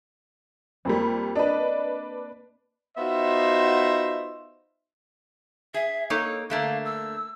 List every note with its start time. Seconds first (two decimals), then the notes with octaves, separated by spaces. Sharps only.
0.85 F2 G3 A#3 C4
1.35 D4 B4 D5 D#5
2.98 B3 D#4 F4 F#4 C5 E5
5.74 G#4 E5
6.10 A#3 D#4 A4 C#5
6.50 D3 A3 A#3 F5
6.85 E6